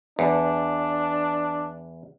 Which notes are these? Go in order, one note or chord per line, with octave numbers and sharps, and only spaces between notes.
E2 D4